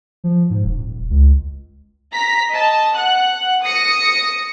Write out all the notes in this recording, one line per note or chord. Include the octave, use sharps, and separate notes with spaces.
F3
G#2
D#1
C#2
A#5 B6
D#5 A5
F#5 F#6
D#6 A#6 C#7